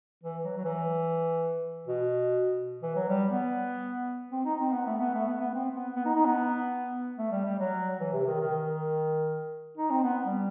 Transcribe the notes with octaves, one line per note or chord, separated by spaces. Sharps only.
E3
F#3
F#3
E3
B2
E3
F#3
G3
B3
C4
D#4
C4
B3
A3
B3
A3
B3
B3
C4
B3
B3
D#4
D#4
B3
A3
G3
G3
F#3
E3
C3
D#3
D#3
D#3
D#4
C4
B3
G3